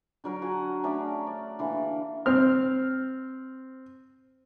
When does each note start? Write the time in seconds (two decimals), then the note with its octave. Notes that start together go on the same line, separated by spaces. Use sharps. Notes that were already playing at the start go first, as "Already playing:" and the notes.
0.24 D3 F#3 A#4
0.42 F#4 F#5 G#5
0.84 A3 C#4 D4 A#4
1.27 D5
1.59 D3 E3 A#3
2.26 C4 F6